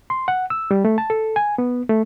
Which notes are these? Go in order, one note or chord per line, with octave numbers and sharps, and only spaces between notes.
C6
F#5
E6
G3
A3
A5
A4
G#5
B3
A3